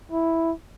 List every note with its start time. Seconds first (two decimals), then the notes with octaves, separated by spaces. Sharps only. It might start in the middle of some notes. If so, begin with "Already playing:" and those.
0.11 E4